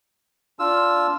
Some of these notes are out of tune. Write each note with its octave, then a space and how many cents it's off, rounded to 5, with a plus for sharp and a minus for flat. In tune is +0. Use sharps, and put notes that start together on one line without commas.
D4 -20 F4 +0 E6 +0